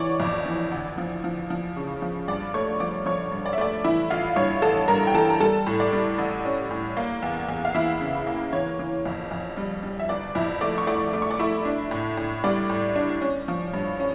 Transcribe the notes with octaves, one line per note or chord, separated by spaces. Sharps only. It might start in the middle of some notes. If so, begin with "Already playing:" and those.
Already playing: E3 C#5 D5 C#6 D6
F2
E3
D2
F3
F3
F3
C#3
F3
G2 D5 D6
A3 C#5 C#6
F3 D5 D6
F3 C#5 C#6
G2
D5
E5
A3 D5
E3 E4 E5
A1 F4 F5
G2 C#5 C#6
A1 A4 A5
G2 A#4 A#5
G5
E3 A4 A5
A#5
G3 A4 A5
A2
D5
G3
A1
C#4
A2
A#3
E2
E2
F5
E3 E4 E5
C#3
A#3
E3 C#5
E3
F2
F2
G3
G3
E5
G1 D5
F2 E4 E5
A3 D5 D6
C#6
A3 D5 D6
A3 D6
C#6
D5 D6
A3 E4 E5
D4
A2
A2
G3 D5
A2
D4
C#4
F3
G2
C#4